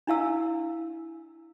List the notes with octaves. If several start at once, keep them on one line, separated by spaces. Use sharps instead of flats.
D4 E4 F5 E6